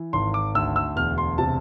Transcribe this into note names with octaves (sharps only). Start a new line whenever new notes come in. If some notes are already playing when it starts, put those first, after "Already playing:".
Already playing: E3
G#1 C6
D6
D2 E6
E6
E1 F6
C6
C3 A5